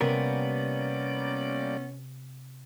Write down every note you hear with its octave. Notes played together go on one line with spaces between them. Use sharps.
C3 G3 A#3 B3 C#4 A#4 D5 G#5